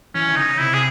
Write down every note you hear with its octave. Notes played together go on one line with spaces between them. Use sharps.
E3 C#4
D#3
C#3 D#4
C3 E4
G#4